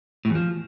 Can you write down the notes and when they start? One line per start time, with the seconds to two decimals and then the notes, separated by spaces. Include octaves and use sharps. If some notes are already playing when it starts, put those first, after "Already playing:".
0.25 A2
0.30 E2
0.35 F3